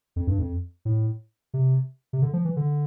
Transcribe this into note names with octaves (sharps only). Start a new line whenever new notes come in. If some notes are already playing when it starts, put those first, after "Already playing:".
F2
G2
F2
A2
C3
C3
D3
F3
E3
D3